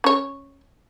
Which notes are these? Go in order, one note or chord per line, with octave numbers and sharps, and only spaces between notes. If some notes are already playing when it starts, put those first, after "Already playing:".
C#4 C#5